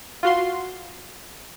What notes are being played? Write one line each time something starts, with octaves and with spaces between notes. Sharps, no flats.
F4 F#4 C6